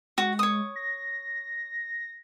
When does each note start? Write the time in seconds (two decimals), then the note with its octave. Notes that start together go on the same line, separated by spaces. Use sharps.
0.18 G#3 F#4
0.39 C#5 D#6
0.76 A#6